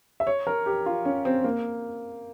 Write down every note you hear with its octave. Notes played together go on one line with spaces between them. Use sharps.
E5
C#5
A#4
G4
F4
C#4
C4
A#3